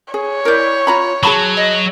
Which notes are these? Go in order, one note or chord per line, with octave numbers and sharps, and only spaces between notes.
G#4 C#5
E4 A#4 D5 G6
F4 A#5 B5
F#3 G#4 A5 B5 C#6
D#5